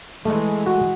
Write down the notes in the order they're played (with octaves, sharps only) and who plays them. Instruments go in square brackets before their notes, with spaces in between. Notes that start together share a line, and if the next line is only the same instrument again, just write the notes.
[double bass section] E3 G#3 [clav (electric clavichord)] A3
[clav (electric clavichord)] F#4